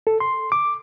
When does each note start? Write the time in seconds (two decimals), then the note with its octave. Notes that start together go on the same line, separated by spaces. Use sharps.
0.07 A4
0.20 C6
0.52 D6